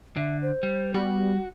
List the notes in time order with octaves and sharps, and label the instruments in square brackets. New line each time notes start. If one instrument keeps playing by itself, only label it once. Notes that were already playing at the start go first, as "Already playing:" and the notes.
[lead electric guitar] D3 [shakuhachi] E5
[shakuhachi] C5
[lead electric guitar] G3
[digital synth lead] G3 [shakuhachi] B3 [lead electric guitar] F#4